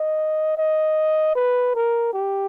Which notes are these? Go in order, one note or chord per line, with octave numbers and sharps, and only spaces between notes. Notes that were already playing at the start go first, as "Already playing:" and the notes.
Already playing: D#5
D#5
B4
A#4
G4